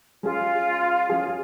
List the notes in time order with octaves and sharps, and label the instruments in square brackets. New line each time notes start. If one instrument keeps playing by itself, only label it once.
[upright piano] G#3 C#4 G#4 [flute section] F4
[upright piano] G#3 C#4 G#4